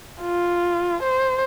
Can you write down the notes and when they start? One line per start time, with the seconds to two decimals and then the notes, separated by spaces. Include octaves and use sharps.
0.22 F4
1.03 C5